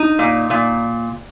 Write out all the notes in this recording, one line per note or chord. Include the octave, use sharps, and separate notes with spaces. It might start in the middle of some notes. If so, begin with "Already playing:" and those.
Already playing: D#4
A#2
A#2